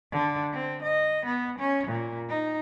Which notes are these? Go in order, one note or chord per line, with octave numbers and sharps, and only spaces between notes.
D3
C4
D#5
B3
C#4
A#2
D#4